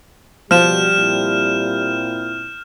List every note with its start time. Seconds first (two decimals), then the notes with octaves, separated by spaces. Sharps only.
0.51 B2 F3 G3 F#4 F6 G6 E7
0.95 A#2 C4 E4